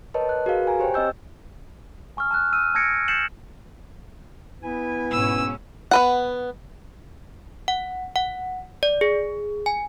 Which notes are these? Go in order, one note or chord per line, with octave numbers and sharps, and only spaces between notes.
A#4 B4 C#5 D#5 A5
F#6
F#4 G#4 A#4 B4 F5
G#5 A#5
G4 C5 C#5 G5
C4 D#5 E6 G6
G#5 C#6 E6 F6
A5 F6 F#6
E6 F6 D#7
A5 E6 G#6 A#6 C#7 D7
G6 A6 C7 C#7 E7 F#7
B3 E4 B4 G#5
G#2 B2 C#4 E6
B3 B4 F#5
F#5
F#5
D5
G#4
G#5